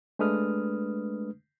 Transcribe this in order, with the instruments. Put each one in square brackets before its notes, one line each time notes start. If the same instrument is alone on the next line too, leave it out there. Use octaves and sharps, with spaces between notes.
[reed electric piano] G#3 A3 D4 B4 D#6 F6